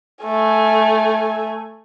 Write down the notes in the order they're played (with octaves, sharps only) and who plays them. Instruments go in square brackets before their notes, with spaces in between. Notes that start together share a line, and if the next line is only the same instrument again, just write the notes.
[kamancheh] A3 G#5